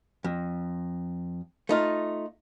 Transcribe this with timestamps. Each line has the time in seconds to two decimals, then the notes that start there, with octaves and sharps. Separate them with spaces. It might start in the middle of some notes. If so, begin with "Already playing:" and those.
0.24 F2
1.69 A3 D#4 F4